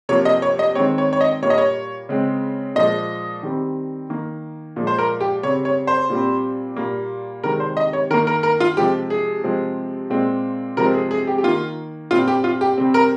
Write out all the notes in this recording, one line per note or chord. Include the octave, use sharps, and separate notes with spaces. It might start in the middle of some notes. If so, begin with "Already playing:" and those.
C3 F3 A#3 C#5
D#5
C#5
D#5
D#3 G#3 C4 C#5
C#5
C#5
D#5
A#2 G3 A#3 C#5
D#5
C#5
C#3 G#3 C4
A#2 F3 G#3 D#5
D#3 G3 C4
D#3 A#3
A#2 F3 G#3
C5
A#4
G4
C#3 G3 C4 C#5
C#5
C5
A#2 G3 C4
A#2 G3 A#3
C3 D#3 G#3 C4 A#4
C5
D#5
C#5
D#3 A#3 A#4
A#4
A#4
F4
C3 F3 G#3 G4
G#4
C3 F3 G#3 C4
A#2 G#3 C4
C3 F3 G#3 C4 A#4
G#4
G#4
G4
G4
D#3 A#3 F4
A#2 G3 C4 F4
G4
F4
G4
C3 G3 C4
A#4